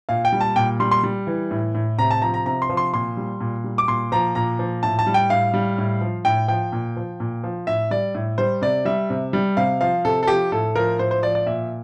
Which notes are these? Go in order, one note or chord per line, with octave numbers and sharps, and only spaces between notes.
A#2 F5
G5
G3
A5
A#2 G5
G3 C6
C6
G3
E3
A2
A2
C3 A#5
A5
F3 A#5
A#5
C3 A#5
C6
F3
C6
A#2 C6
G3
A#2
G3
D6
A#2 C6
F3 A#5
A#2 A#5
F3
A2 A5
A5
G3
G5
A2 F5
G3
A2
F3
A2 G5
F3 G5
A#2
F3
A#2
F3
A2 E5
G3 D5
A2
G3 C5
C3 D5
G3 E5
C3
G3
C3 F5
F3 F5
C3 A4
A4
F3 G4
A2 A4
F3 A#4
A2 C5
C5
F3 D5
D5
A#2 E5